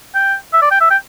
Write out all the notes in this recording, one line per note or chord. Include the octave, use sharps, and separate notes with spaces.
G5
E5
D5
G5
E5
G5